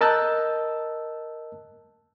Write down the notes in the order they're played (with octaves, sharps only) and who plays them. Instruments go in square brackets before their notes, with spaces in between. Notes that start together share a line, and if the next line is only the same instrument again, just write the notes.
[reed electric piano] A#4 D#5 A5 E6 F#6 G6